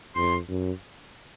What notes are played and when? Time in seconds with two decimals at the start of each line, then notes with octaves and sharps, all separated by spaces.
0.16 F2 C6
0.48 F#2